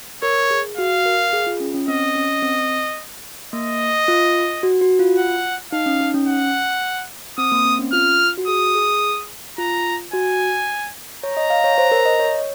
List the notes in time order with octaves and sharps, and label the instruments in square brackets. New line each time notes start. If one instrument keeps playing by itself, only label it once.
[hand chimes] A#4 [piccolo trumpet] C#5
[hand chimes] G#4
[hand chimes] F#4 [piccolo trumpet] F5
[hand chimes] A#4
G#4
F4
C#4
C#4
[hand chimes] C4 [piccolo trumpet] D#5
[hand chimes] C#4
C4
[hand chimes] A#3 [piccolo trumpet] D#5
[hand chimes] F4
F#4
F#4
F4
[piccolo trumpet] F#5
[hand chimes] D#4 [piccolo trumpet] F5
[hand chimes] C#4
D#4
C#4
[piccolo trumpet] F#5
[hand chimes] C4 [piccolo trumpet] D#6
[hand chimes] A#3
C4
C#4
[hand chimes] F4 [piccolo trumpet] F6
[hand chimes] F#4
[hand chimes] G#4 [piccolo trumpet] D#6
[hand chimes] G#4
[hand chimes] F4 [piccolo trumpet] A#5
[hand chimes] F#4 [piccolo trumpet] G#5
[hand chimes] C#5 [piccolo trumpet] A#5
[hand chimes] D#5
F5
C#5
C5
A#4
D#5
C#5